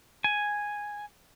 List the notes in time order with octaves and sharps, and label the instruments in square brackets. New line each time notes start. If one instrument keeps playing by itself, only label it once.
[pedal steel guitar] G#5